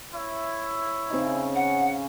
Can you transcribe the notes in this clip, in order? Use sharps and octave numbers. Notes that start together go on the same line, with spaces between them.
E4 C#5 E5
C#3 C4 C#4 D#4
F#5